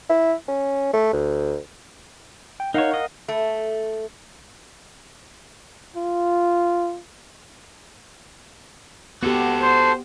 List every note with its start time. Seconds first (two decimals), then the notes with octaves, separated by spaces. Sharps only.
0.09 E4
0.48 C#4
0.94 A3
1.13 D2
2.60 G5
2.74 D#4 A#4 C#5 F5 F#5
2.94 D#5
3.28 A3
5.96 F4
9.23 B3 F#4 G4 A4
9.62 C5